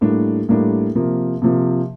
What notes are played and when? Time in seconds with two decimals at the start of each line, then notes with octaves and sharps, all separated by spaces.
0.01 A2 G3 A#3 D4
0.49 A2 G3 A#3 D4
0.95 C3 F3 A#3
1.42 C3 F3 A#3